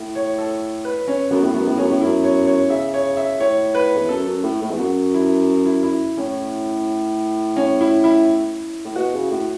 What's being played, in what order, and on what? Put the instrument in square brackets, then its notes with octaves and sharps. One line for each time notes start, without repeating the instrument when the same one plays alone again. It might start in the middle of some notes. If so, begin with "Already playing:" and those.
Already playing: [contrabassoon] A2
[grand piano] C#5
A4
B4
C#4
[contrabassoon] F#2 [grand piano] B3
[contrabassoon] A2
[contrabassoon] F#2 [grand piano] B3
[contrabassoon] A2
[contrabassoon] F#2 [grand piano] C#4
[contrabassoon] A2
[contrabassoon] F#2 [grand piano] E4
[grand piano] C#5
C#5
[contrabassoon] C#3 [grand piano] E5
[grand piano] C#5
E5
[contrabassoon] A2 [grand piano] C#5
[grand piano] B4
[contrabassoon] E2
[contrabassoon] F#2 [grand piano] A4
[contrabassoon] F#2
A2
A2
E2
[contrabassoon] F#2 [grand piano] F#4
[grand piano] E4
E4
E4
[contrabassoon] A2 [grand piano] C#4
[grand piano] C#4
E4
E4
[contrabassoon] A2
[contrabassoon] B2 [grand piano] F#4
[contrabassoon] C#3
A2